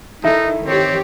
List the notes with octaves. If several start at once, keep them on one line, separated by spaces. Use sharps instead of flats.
D#3 D#4 E4 A4 E5 A#5
D#3 C4 G4 C#5